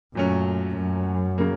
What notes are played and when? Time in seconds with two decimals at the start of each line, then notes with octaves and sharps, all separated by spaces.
0.15 F#2 A#2 F#3 A3 C#4
0.77 F#2
1.38 C#3 F#3 A#3